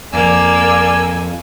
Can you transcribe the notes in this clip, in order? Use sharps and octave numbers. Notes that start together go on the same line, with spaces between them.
F2 F3 A#3 D5 G#5 E6